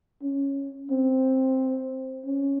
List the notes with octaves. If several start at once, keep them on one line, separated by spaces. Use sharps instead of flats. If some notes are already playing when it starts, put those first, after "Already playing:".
C#4
C4
C#4